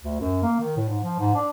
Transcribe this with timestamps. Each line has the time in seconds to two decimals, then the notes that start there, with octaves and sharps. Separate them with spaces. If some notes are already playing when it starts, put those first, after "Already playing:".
0.03 D2
0.21 F#2
0.43 A#3
0.60 D#3
0.76 A2
0.90 G#2
1.04 F3
1.19 G#2
1.35 D4